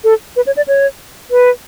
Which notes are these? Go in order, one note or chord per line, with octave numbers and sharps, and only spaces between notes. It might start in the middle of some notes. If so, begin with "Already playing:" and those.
A4
B4
C#5
D5
C#5
B4